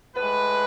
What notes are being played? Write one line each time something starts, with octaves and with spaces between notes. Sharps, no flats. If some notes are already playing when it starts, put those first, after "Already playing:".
A2 G#3 B4